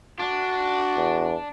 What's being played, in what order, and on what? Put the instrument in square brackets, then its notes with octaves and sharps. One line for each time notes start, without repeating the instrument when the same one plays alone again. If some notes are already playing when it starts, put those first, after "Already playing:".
[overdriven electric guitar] D4 [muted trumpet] F#4
[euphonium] E2